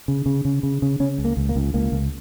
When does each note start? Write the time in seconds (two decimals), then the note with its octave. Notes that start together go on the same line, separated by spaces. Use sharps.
0.08 C#3
0.26 C#3
0.45 C#3
0.63 C#3
0.82 C#3
1.00 C#3 C#4
1.18 C#2
1.25 A#3
1.37 C#2
1.49 A#3
1.56 C#2
1.74 C#2 A#3
1.92 C#2